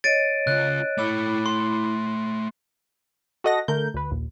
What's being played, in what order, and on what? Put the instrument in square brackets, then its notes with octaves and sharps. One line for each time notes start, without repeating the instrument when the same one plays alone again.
[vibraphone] C#5 D#5 [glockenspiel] A6 D7 D#7
[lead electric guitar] C#3 F4 [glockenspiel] F#6
[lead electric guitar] A3 C#5 [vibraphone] E4 B5 D6
[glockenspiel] C6
[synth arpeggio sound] F#4 A4 D#5 F#5 A#6
D3 A3 A#4 G6
D2 B4
A#1 D#2